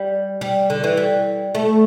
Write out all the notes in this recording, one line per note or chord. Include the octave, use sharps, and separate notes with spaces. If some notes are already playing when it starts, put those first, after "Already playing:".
Already playing: G3
G3
D3
E3
G3
A3